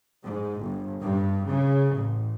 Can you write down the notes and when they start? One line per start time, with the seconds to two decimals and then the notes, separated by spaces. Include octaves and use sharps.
0.25 G#2
0.60 G1
1.01 G2
1.46 C#3
1.94 A1